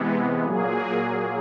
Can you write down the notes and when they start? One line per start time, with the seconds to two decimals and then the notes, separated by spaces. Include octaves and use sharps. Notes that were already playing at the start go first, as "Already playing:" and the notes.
Already playing: C3 E3 G#3 B3
0.44 A#2 F#3 A#3 G#4